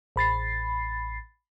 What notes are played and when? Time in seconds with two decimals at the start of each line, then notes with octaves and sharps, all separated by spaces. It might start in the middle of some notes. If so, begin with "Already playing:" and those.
0.16 A1 B5 A6 C7